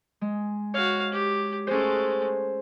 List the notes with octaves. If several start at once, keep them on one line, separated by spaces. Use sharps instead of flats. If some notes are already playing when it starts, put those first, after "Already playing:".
G#3
F#4 C#5 F5
G4
G#3 A3 C#4 C5